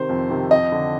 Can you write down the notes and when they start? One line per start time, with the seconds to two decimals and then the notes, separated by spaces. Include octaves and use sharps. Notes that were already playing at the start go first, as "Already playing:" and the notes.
Already playing: C3 D#3 C5
0.09 F2
0.30 C3 D#3
0.51 F2 D#5
0.72 D3